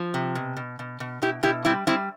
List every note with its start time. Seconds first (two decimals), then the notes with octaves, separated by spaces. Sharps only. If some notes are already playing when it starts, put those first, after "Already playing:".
Already playing: F3
0.14 C3
0.35 B2
0.57 B2
0.79 B2
1.00 B2
1.22 B2 E4 G4
1.43 B2 E4 G4
1.65 G3 C4 E4
1.87 G3 C4 E4